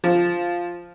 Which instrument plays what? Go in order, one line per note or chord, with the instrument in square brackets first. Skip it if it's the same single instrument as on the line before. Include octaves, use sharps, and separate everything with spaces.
[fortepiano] F3